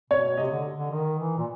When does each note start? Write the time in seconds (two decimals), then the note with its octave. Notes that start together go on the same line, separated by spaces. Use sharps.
0.10 B2 C#5
0.37 C3 D#5
0.51 D3
0.78 D3
0.91 D#3
1.19 E3
1.38 A#2